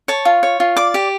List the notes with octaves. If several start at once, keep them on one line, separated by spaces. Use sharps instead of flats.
C#5 A5
F4
C#5
F4
D5 D6
G4